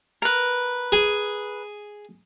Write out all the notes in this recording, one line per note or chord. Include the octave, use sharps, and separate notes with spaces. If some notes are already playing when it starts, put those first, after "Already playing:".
A#4 B4
G#4